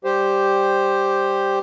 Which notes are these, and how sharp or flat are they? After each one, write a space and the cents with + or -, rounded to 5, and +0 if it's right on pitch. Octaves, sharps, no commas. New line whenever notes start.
G3 +0 G4 +0 C5 +0